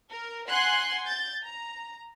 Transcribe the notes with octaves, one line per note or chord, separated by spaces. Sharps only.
A#4
F#5 G#5 C6 F#6
G6 A6
A#5